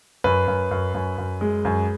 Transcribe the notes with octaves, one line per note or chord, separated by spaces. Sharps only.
F#2 B4
F#2
F#2
F#2
F#2
G#3
F#2